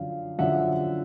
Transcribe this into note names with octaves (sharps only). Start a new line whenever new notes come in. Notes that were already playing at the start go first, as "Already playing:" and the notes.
Already playing: F#2 D3 F3 F5
F#2 D3 F3 E5 F#5